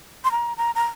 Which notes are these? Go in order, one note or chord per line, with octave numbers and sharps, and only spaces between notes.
C6
A#5
A#5
A#5